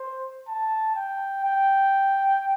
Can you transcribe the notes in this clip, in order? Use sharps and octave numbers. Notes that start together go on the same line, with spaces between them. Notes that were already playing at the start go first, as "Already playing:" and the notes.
Already playing: C5
A5
G5
G5